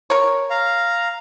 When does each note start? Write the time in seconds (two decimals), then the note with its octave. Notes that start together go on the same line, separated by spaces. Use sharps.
0.10 A#4 C#5
0.50 F5 A#5